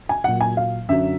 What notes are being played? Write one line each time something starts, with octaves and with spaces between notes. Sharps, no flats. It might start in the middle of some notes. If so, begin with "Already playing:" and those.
G#5
A#2 F#3 F#5
G#5
F5
F#2 D3 F#3 E5